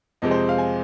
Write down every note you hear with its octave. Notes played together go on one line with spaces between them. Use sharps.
F2 C3 G#3 C4 D#5
C5
F5
G#5